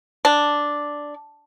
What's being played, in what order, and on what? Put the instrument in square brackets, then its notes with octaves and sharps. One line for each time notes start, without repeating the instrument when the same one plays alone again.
[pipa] D4